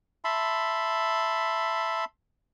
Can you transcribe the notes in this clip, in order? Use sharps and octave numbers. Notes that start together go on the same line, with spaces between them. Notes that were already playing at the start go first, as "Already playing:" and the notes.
E5 A5 B5 C6